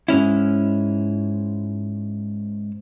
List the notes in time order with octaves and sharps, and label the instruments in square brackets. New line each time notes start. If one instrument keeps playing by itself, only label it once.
[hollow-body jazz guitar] G#2 G#3 C#4 E4